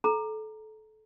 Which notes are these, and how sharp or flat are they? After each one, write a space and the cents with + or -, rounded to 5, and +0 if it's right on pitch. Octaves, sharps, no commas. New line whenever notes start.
A4 -25 A#5 +0